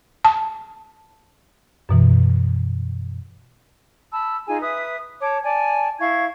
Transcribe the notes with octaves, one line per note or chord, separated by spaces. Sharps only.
A5
F#2 B2 E3
A5 B5 E6
D#4 F4 G#4 G#5
B4 E5 D#6
C#5 A5 D6
D5 G#5 A5
E4 F5 C#6 G#6